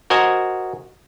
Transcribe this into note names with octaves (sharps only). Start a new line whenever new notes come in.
F#4 A#4 C5 D#5 G#5